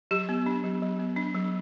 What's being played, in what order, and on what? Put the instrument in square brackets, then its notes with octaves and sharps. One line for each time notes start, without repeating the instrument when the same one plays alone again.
[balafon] F#3 G4
B3
D4
F#3
F#3
B3
D4
F#3